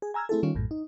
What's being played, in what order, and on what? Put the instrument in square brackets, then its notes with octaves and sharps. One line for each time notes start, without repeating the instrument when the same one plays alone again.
[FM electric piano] G#4
G#5 A#5 E6 F6 G#6
A3 C4 E4 G#4 A4
D#3 G3 C#4 F4
A#1 F#2 A2
D#4